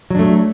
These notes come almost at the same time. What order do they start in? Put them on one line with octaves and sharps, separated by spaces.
F#3 D4 A3